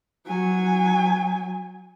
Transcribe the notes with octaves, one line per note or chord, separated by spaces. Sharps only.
F#3 G#5